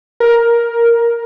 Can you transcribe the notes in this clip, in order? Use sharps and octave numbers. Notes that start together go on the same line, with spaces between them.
A#4